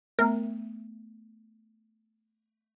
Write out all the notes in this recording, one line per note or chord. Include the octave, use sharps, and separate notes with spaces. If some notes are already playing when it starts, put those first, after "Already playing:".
A3 B3 A#4 E5